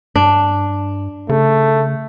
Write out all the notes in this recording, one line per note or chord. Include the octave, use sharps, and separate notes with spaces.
G2 D4
C#3 A3